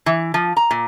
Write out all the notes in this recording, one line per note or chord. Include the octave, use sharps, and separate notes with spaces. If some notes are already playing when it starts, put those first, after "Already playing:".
E3
F3
A#5
A#2